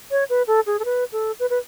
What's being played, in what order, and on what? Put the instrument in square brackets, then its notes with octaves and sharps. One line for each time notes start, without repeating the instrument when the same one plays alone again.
[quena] C#5
B4
A4
G#4
A4
B4
A4
B4
B4